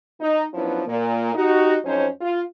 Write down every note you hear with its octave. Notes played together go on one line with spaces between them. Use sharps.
D#4
F3 F#3 B3 C#4 D4 E4
A#2 A#3
D#4 F#4 G4
F2 F#3 C#4 D#4 C5
F4